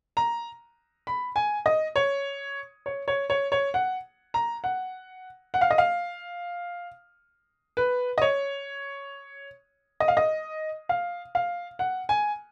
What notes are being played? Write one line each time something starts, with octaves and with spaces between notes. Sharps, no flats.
A#5
B5
G#5
D#5
C#5
C#5
C#5
C#5
C#5
F#5
A#5
F#5
F#5
F5
D#5
F5
B4
D#5
C#5
D#5
F5
D#5
F5
F5
F#5
G#5